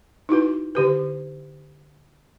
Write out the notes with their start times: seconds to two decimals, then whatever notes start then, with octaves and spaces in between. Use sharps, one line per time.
0.29 D#4 E4 F#4 B4
0.75 D3 G4 B4